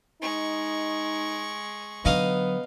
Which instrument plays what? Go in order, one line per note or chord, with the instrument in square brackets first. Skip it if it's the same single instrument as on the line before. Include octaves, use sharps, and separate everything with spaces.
[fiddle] G#3 C#6 [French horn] D#4
[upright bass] D3 F#3 [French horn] B3 [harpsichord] D#4 F5 D#6